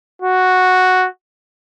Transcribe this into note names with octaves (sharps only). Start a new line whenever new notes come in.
F#4